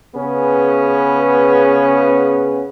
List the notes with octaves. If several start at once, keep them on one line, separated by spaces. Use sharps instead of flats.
C#3 B3 C#4 G#4 B4